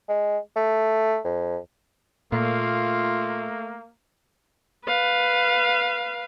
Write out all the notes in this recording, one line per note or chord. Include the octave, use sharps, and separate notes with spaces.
G#3
A3
F2
A#2 A3 A#3 F4
B4 F5